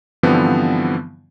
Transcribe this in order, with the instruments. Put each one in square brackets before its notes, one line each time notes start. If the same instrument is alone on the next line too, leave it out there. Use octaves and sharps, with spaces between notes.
[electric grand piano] G2 D3 E3 F3 B3 C4